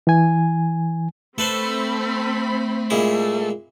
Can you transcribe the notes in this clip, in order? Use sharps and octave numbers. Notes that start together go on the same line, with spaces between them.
E3 G#5
A3 C4 A4 B4 C5 B5
A#2 G#3 E4